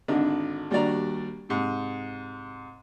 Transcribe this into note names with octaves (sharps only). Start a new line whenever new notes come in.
G#1 D3 D4 D#4
D#2 G3 D4 F#4 D5 A#5
G#2 C3